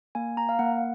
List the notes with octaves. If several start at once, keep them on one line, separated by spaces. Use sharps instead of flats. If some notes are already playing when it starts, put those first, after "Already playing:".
A#3 G#5
A#3 A#5
F5
A#3 F#5